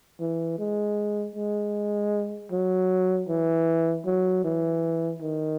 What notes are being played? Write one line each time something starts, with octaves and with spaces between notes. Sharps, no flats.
E3
G#3
G#3
F#3
E3
F#3
E3
D#3